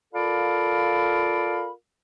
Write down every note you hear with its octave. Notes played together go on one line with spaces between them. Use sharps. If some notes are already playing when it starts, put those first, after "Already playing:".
F4 A4 A#4 D5 F5 B5